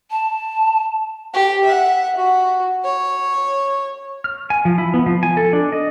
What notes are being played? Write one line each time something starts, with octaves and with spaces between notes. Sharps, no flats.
A5
G4
E5 F#5
F#4
C#5
F6
G#5
F3
E4
B3
F3
G#5
A4
D4
D#5